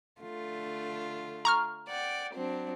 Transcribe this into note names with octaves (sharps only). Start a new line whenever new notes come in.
D3 A3 F4
A#5 C#6 F6
D5 F#5 G5
F#3 C4 D4